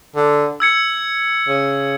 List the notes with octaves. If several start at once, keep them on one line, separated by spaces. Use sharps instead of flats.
D3
E6 G#6 C#7
C#3